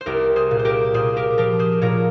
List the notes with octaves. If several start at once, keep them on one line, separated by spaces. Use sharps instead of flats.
C5
C2 G4 A#4
G#4 C5
A#2
C5
G4 A#4
A#2 G#4 C5
G4 A#4
F3 G4 A#4
G#4 C5
A#2 A#4 C#5